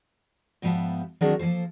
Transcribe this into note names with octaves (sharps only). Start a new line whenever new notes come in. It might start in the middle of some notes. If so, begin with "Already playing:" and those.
G#2 F3 G3 B3 E5 A5
D#3 F#3 C4 D4 G#4 A#4
F3 A#3 A4 C5